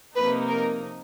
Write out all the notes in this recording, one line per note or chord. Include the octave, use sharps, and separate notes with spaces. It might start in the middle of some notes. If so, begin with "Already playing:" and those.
C3 F3 A#3 D#4 B4
A#4